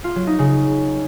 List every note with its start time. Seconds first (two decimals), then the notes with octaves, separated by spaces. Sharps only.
0.04 F4
0.16 F#3
0.27 D#4
0.39 C#3